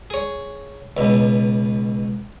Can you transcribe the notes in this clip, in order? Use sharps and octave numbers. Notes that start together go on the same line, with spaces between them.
G#4 C#5
C#2 B2